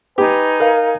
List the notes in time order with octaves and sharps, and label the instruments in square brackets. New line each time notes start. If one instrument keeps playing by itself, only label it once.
[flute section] D#4 G#5 [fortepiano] G4 [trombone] B4
[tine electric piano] A#4 F5